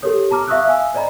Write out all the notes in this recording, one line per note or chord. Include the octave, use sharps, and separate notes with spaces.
G4 A4 A#4 C#5 D#6
A5 A#5 D6 F6
E5 F5 C#6 D#6 E6 F#6
F5 G#5 E6
C5 D5 D#5 A#5 B5